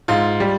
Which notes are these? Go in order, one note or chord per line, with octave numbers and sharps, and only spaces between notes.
G#2 F4
G3